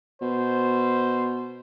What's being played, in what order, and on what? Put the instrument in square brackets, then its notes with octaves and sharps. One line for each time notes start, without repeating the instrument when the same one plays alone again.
[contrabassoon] B2 [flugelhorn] C5